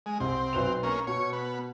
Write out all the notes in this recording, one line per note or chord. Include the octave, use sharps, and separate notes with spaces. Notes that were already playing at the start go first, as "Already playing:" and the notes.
G#3
C2 C4
B1 B4 F7
A#3 C#4
B2 C#5
B3